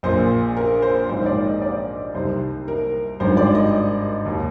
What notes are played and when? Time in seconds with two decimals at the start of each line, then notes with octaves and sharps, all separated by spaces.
0.03 A#1 A#2 C5
0.57 A#4
0.82 C5
1.09 A#1 G#2 D#3 C5
1.26 D5
1.45 D#5
1.62 D5
2.14 C2 C3 D#3 C5
2.68 A#4
3.20 G#1 G2 D#3 C5
3.37 D5
3.55 D#5
4.25 D#2 D#3